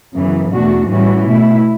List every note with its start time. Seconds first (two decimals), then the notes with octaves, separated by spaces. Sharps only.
0.15 F#2 C#3 E3 B3
0.52 E2 B2 A3 D4 F#4
0.89 A2 E3 G3 C#4 F#4
1.27 B2 A3 E4